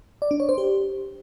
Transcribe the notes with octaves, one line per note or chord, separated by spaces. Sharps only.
D5
D4
C#5
C5
G4